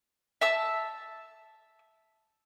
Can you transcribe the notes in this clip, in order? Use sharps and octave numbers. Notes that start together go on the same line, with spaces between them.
E5 A5 E6